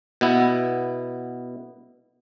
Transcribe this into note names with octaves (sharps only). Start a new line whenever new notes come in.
B2 B3 E4